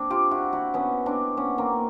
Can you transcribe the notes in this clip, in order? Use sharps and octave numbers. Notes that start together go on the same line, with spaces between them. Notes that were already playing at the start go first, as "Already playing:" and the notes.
Already playing: C4 D4
F4 G4
E4 F#4
E4 F#4
B3 C#4
C4 D4
B3 C#4
A#3 C4